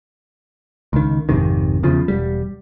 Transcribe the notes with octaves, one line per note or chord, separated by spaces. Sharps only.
C#2 D#3
G#1 F2 C3 D#3
E2 C#3 F3
E1 G3